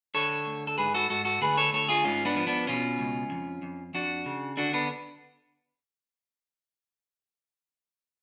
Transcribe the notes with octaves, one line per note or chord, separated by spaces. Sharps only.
D3 A4 C#5
D2
A4
G#2 G#4 B4
F#4 A4
G#2 F#4 A4
F#4 A4
D2 G#4 B4
A4 C#5
D2 A4 C#5
F4 G#4
G#2 C#4 F4
B3 D4
F3
B3 D4
B2 C#4 F4
C#2
F2
F2
F2 D4 F#4
C#3
D3 D4 F#4
B3 D4